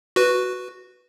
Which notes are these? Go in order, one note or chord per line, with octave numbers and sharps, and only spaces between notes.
F#4 B4